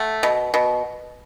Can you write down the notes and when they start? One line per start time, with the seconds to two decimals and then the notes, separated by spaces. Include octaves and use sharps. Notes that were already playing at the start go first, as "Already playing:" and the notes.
Already playing: A3 F#5
0.23 B2
0.54 B2